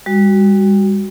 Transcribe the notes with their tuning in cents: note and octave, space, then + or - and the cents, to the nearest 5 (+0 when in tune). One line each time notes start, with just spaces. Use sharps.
G3 +35 F#4 +15